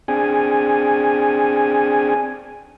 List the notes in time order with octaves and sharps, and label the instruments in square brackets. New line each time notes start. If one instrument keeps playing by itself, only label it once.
[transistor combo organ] C4 D4 G#4 G#5